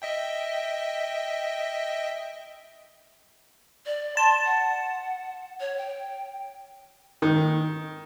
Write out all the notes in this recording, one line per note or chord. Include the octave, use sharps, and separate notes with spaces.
D#5 E5 G5
D5
A5 C6
F#5
C#5
G5
D#3